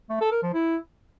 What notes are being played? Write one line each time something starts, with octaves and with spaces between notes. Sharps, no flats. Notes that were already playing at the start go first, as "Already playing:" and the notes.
A3
A4
A#4
F3
E4